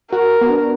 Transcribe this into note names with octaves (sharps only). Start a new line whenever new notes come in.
F#4 A#4
B3
D4